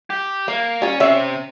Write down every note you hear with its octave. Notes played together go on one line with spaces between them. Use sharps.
G4
A#3 F5
G3 C#4 F4
C3 C4 C#4 E5